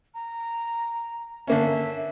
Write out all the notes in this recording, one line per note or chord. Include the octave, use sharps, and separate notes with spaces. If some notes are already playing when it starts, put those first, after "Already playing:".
A#5
D3 A#3 C#4 E5